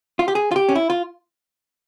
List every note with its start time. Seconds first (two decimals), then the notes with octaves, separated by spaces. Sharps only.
0.19 F4
0.28 G4
0.35 G#4
0.51 F4
0.56 G4
0.69 C#4
0.75 E4
0.90 F4